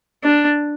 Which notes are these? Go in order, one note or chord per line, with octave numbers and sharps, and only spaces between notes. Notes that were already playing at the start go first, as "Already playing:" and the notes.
D4